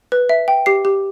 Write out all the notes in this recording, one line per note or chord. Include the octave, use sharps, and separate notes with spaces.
B4
E5
G5
G4 C7
G4